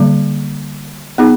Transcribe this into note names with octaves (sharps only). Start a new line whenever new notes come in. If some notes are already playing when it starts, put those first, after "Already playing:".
Already playing: D3 G3 A#3
B3 D#4 G#4